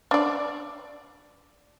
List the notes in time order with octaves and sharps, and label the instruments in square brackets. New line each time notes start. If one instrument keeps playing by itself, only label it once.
[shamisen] D4 D5